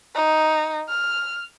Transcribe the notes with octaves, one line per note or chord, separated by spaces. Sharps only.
D#4
F6